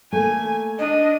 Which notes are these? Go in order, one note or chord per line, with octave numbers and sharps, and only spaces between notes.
A3 A#3 G#5
D4 D#5